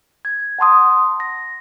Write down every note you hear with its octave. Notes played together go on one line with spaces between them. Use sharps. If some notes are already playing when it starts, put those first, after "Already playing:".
G#6
F#5 A5 C6 D#6
A#6